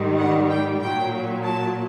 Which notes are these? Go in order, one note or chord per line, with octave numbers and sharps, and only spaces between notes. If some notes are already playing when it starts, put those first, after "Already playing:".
Already playing: G#2 D#3 G3
F#5
G5
A#2 F#3 G5
A5